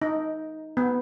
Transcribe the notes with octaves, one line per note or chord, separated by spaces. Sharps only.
D#4
B3